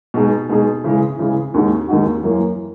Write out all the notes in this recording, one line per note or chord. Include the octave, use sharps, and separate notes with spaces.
B2 G#3 D#4 G#4
B2 G#3 D#4 G#4
C#3 E3 G#3
C#3 E3 G#3
D#2 D#3 G#3 D#4 F#4
D#2 D#3 G#3 D#4 F#4
F#2 E3 A#3